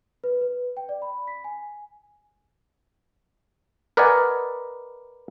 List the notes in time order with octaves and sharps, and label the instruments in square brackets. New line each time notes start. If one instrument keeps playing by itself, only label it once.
[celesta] B4
B4
G5
D5
B5
B6
G#5
[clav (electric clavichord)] A#4 B4 D5 D#5 F#5 G#5